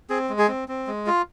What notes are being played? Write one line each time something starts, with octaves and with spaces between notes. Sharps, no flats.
C4 G#4
G#3
G#4
C4
C4
G#3
F4